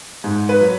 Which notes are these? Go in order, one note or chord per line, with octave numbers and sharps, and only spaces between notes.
G#2
B4
F#3